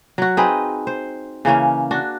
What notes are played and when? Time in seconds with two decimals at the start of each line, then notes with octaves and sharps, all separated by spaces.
0.18 F#3 F#4
0.37 C4 D#4 G#4 B4
0.87 C5
1.45 C#3 E3 A#3 C#4
1.91 D4 F#4